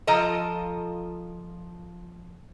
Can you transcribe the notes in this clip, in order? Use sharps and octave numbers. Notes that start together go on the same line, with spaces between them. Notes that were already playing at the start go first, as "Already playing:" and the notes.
F3 F4 A4 D#5 A#5